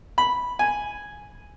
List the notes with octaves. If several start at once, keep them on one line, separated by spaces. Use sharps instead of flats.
B5
G#5